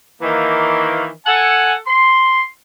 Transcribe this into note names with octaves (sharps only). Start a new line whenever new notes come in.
D#3 E3 A#3
A4 F#5 G#5
C6